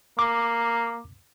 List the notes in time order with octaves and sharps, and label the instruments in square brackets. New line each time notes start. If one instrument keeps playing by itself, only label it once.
[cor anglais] A#3 [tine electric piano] D6